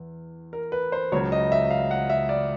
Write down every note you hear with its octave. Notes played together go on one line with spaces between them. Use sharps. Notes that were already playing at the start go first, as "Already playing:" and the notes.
Already playing: E2
A#4
B4
C5
C#2 C#3 F#3 C#5
D#5
E5
F5
F#5
E5
D5